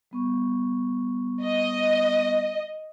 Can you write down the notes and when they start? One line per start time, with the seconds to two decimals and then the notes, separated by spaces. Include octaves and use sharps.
0.11 G3 B3 C#6
1.43 D#5